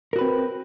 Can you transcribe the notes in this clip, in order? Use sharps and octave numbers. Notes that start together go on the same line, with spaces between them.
C4 F#4 A#4 B4